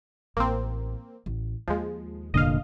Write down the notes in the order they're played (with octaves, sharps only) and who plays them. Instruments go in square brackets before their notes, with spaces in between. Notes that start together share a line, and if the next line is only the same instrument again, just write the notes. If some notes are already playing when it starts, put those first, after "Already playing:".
[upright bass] A1 [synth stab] A#3 C4
[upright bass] A1
[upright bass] D#2 [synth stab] F3 G#3
[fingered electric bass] F1 A#2 D3 [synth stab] D#5 F5